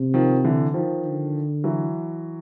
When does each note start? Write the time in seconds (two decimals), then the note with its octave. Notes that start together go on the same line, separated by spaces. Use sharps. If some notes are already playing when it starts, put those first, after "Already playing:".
Already playing: C3
0.14 D#3 F3
0.44 D3 E3
0.74 D#3 F3
1.04 D3
1.64 E3 F#3